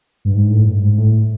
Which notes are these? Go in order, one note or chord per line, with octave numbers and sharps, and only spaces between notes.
G2
G#2
A2
G2
G#2
A2